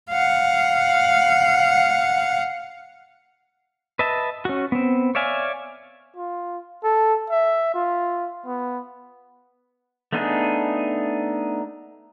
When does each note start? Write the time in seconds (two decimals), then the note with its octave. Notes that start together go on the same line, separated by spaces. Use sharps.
0.10 F5 F#5
3.99 B4 D#5 E5 A5
4.45 C#4 F#4
4.72 B3 C4
5.15 C#5 D5 E5 F5 G#5
6.17 F4
6.84 A4
7.30 E5
7.74 F4
8.46 B3
10.13 A3 B3 D4 D#4 G#4